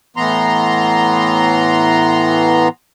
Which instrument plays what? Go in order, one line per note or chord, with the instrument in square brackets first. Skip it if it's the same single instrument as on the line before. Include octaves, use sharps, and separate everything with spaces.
[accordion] A2 E3 B3 A#5 C6